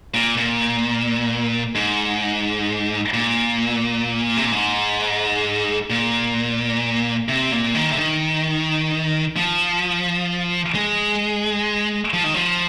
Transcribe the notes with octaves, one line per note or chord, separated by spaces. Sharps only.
A#2
A#2
G#2
A#2
C3
A#2
G#2
A#2
C3
A#2
D#3
C3
D#3
F3
G#3
F3
D#3
F3